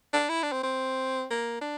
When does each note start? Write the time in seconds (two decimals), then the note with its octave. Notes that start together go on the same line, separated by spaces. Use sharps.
0.13 D4
0.29 E4
0.43 D4
0.52 C4
0.63 C4
1.31 A#3
1.61 D4